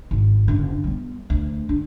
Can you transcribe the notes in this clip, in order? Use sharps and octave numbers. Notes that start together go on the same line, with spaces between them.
G#1
F#1 D3
G3 B3
D2
D4